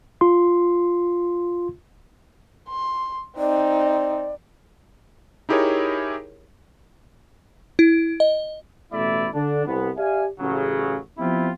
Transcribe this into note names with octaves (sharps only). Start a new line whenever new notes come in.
F4 C6
C6
C4 D#4 D5
D#4 E4 G4 G#4 A#4 C#5
E4
D#5
A1 B2 A3 E4 D5 E5
D3 D4
C2 B3
G4 D5 E5 F5 G#5
A1 C#3 F#3
F3 B3 C4 E4 F4 G4